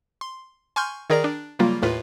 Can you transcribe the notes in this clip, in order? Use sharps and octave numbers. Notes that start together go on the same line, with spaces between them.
C6
G#5 C6 C#6 F6 G6
D#3 G#4 A#4 D5 A#5 A#6
D4
C#3 F#3 G3 A#3 F4
D#2 A2 F4 B4